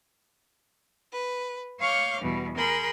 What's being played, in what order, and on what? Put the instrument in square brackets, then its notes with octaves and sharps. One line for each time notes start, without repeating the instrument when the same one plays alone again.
[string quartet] B4
C#5 F5 C#6 D6 F6 G6
E2 B2 G3
G#4 A#4 B5 C6 G6